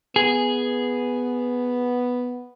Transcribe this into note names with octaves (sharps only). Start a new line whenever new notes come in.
B3 G#4